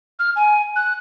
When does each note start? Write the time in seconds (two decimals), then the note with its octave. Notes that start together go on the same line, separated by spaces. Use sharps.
0.19 F6
0.36 G#5
0.76 F#6